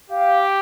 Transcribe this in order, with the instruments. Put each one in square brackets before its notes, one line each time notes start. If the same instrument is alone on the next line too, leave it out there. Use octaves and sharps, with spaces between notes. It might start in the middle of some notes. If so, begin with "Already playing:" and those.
[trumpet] G4 [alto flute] F5